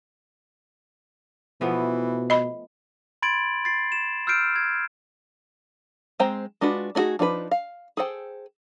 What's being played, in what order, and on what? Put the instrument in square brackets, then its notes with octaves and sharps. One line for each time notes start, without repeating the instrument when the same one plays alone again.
[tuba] B2 [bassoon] E3 [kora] F3 A3 B3
[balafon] D#5 B5
[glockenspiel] B5 C6 G#6 A6 D7 F#7
A6 C7
E7
E6 F6 G6 C7 D7
G#6
[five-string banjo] G#3 C4 C5 G5 A#5
G#3 D4 F4 F#4 B4
A3 D4 D#4 F#4 G#4
F3 D4 D#4 G#4 B4
F5
G#4 A4 C5 G5